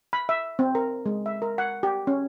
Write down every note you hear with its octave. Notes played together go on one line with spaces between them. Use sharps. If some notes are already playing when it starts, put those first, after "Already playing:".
B5
E5
C4
A#4
G#3
E5
A#4
F#5
G4
C#4